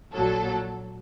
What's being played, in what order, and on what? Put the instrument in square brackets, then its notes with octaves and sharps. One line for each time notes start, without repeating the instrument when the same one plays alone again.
[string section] A#1 A#2 F#3 A4